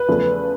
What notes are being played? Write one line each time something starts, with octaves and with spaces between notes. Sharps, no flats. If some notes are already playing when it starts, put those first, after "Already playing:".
Already playing: B4
E2 C#3 F3 A3 C#4